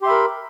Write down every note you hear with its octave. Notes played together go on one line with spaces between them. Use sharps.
G4 A#4 E5 B5 C6